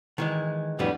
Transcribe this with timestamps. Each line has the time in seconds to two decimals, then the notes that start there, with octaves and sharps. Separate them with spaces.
0.18 D#3 E3 G#3
0.79 F2 A2 D3 E3 G3 B3